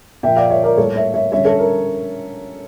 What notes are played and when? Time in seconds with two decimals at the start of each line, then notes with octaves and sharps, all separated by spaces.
0.23 A#2 F3 A#3 E5 G5
0.37 D5 F5
0.50 C#5 E5
0.64 A#4 D5
0.77 A2 G3 A#3 A4 C#5
0.96 C#5 E5
1.14 C#5 E5
1.32 D3 G3 C#4 C#5 E5
1.45 A4 C#5
1.59 A#4